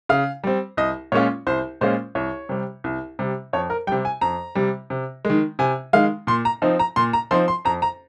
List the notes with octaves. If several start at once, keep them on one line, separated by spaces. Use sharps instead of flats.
C#3 F5
G3 C4
C2 D#5
A#2 G#3 C#4 F4 C#5
C2 C5
A#2 G#3 C#4 F4 C5
C2 C#5
C3 G3
C2
C3 G3
F2 C#5
A#4
C3 G3 G5
G#5
F2 A#5
C3 G3
C3
D#3 G#3
C3 G#5
D#3 G#3 F5
A#2 C6
A#5
F3 C4 D#4
A#5
A#2 C6
A#5
F3 C4 D#4 C6
C6
F2 A#5
A#5